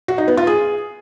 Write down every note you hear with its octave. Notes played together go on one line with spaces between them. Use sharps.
F#4
D#4
B3
F4
G#4